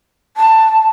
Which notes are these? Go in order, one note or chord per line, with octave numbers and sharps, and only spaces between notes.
A5